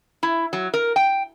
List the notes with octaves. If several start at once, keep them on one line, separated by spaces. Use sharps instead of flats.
E4
F#3
A#4
G5